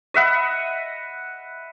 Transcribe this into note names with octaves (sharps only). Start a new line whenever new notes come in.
D#5 E5 F#5 B5